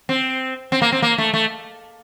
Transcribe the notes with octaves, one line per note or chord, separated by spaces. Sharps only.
C4
C4
A#3
C4
A#3
A3
A3